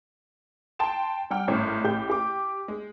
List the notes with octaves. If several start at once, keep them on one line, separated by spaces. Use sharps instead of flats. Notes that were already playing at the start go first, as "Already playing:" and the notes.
G5 A5 C6 E7
G3 F#5 G5 F6
G#1 A2 C#4
A1 A2 G4 G6
G4 D6
G#3